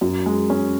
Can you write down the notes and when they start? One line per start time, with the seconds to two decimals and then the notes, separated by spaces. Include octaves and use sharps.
0.01 F#2
0.26 G#3
0.50 C#4